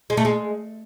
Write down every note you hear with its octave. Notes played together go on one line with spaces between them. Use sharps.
G#3
A3
G#3